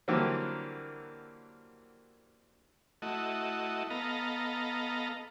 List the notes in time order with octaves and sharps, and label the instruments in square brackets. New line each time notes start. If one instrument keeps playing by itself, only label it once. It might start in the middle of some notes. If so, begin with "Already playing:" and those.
[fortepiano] D3 E3 F#3 G3 A#3 C4
[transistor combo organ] A3 E4 F#4 D#5
B3 A4 D#5 F5 A#5